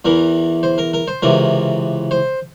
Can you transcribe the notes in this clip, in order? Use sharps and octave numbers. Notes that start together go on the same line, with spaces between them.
E2 E3 A#4
C5
A#4
A#4
C5
C#2 C3 E3 A#4
C5